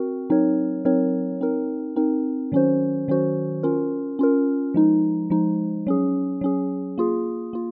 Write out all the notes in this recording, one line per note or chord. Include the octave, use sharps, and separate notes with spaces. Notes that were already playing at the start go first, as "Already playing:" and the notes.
Already playing: C4 F#4 A#4
F#3 C4 D#4 A#4 C#5
F#3 C4 D#4 A#4 C#5
C4 D#4 A#4
C4 D#4 A#4
D#3 F#3 C#4 F#4 C5
D#3 F#3 C#4 F#4 C5
C#4 F4 A#4
C#4 F4 A#4
F3 G#3 D#4
F3 G#3 D#4
F#3 C#4 G#4
F#3 C#4 G#4
A#3 F4 G#4
A#3 F4